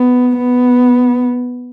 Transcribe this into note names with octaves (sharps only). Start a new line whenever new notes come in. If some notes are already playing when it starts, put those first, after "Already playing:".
Already playing: B3
B3